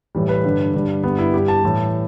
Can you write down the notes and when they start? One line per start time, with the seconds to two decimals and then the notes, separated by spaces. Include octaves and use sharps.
0.15 A2 E3 G3
0.29 B4
0.44 G2 D3 G3
0.74 G2 D3 G3
1.03 G2 D3 G3 B3
1.19 E4
1.34 G2 G3 G4
1.48 A5
1.63 A2 E3 G3